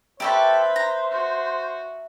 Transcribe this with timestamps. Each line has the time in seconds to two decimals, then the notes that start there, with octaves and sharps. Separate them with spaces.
0.20 G4 A4 B4 C5 E5 B5 C#6
0.76 A#5
1.11 F#4